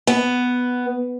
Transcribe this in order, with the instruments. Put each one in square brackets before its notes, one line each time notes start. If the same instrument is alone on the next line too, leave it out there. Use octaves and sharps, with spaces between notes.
[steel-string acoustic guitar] B3